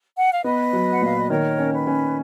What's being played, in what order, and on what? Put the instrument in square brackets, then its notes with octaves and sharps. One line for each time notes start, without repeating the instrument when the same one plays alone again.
[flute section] F#5
F5
[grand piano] B3 [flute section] B4 D#5
[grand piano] F#3
[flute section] F#5
[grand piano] A#2 [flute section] F5
[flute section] D#5
[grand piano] D#3 [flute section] A#4 C#5
[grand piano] C#4
[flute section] B4
[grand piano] C#4